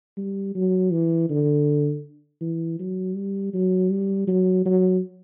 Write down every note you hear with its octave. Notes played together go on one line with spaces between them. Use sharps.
G3
F#3
E3
D3
E3
F#3
G3
F#3
G3
F#3
F#3